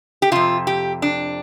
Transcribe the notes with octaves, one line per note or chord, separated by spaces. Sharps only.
G4
F2 C3 F4
G4
D4